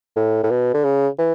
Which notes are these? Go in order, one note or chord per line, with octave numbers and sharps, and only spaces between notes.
A2
A2
B2
D3
C#3
E3